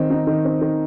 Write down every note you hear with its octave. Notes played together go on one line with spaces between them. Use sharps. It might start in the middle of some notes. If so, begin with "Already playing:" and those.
Already playing: D#3 C4
D#4
D#3
C4
D#3